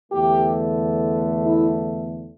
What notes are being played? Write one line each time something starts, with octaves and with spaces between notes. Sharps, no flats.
E2 D3 A3 G4
E4